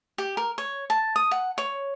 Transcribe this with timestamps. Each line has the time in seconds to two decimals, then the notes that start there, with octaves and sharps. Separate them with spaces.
0.18 G4
0.37 A#4
0.58 C#5
0.90 A5
1.16 D#6
1.31 F#5
1.58 C#5